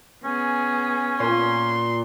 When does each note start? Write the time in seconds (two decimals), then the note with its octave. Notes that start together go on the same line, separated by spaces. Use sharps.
0.24 B3 C#4 G#4
1.20 A#2 C6